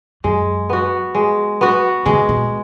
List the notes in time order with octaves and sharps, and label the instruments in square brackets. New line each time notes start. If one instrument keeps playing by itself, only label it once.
[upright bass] F#2 [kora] G#3
[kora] B3 F#4
G#3
B3 F#4
[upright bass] C#3 [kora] G#3
[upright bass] B2